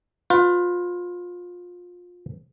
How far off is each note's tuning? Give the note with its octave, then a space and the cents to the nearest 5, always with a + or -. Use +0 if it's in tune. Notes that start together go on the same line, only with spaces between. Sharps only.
F4 +25 B4 +30